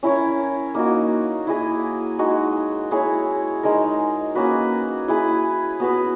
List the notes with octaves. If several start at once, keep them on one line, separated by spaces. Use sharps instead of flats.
C#4 E4 A#4 C#5
A#3 D#4 F#4
E4 G#4 D#5
G#3 D#4 F#4
E4 G#4 C#5
G#3 D#4 A#4
A#3 C#4 F#4 B4
E4 G#4 B4
B3 F#4 B4